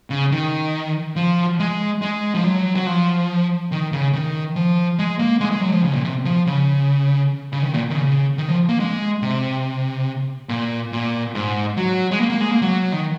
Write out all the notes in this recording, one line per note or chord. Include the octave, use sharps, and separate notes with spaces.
C#3
D#3
F3
G#3
G#3
F3
F#3
F#3
F3
D#3
C#3
D#3
F3
G#3
A#3
G#3
G#3
F#3
F3
C#3
A#2
C3
F3
C#3
C#3
D#3
A#2
D#3
C#3
D#3
F3
A#3
G#3
C3
A#2
A#2
G#2
F#3
G#3
A#3
A#3
G#3
A#3
F#3
D#3